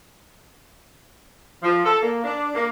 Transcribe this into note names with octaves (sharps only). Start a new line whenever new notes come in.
F3
A4
A#3
D4
A#3